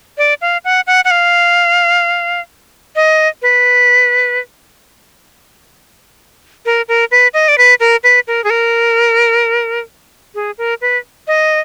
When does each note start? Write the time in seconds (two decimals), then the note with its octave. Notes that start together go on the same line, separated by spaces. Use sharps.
0.18 D5
0.41 F5
0.65 F#5
0.87 F#5
1.05 F#5
1.11 F5
2.96 D#5
3.42 B4
6.66 A#4
6.88 A#4
7.11 B4
7.34 D#5
7.48 D5
7.58 B4
7.80 A#4
8.03 B4
8.27 A#4
8.44 G#4
8.50 A#4
10.35 G#4
10.58 A#4
10.81 B4
11.27 D#5